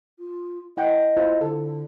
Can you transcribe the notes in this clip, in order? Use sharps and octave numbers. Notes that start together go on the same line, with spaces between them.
F4
E4 D#5 F#5 G5
E4 F4 C5
D3 A4